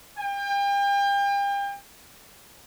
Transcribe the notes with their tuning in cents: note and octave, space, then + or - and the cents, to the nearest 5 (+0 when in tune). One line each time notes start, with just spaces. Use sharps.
G5 +40